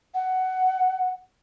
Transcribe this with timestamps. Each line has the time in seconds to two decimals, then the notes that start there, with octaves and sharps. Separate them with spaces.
0.14 F#5